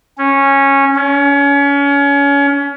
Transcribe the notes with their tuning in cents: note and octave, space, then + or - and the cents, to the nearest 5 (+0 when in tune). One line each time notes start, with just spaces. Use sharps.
C#4 -10
C#4 +30